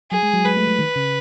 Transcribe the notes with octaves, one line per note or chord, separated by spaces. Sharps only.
F#3 G#4
G#3
F#3
G#3 B4
A3
F#3
D#3
C#3